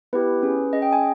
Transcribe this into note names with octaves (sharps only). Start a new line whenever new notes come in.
B3 E4 G4 B4
C#4 G#4
C#4 G#4 D#5
G5
G#5